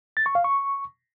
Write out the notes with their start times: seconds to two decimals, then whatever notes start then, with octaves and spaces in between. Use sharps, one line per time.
0.17 A6
0.26 C#6
0.35 F5
0.44 C#6